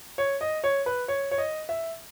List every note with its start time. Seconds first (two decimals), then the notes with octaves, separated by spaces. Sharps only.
0.18 C#5
0.41 D#5
0.64 C#5
0.86 B4
1.08 C#5
1.31 C#5
1.38 D#5
1.69 E5